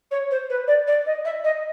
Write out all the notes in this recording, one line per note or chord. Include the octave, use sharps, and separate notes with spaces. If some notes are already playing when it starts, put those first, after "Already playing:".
C#5
C5
B4
D5
D5
D#5
E5
D#5